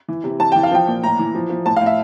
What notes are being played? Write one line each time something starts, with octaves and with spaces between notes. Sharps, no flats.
E3
C3
E3 A5
E3 G5
F5
F3 G5
A#2
A2 A#5
E3
F3
F3
A2 A5
F5
A2
E5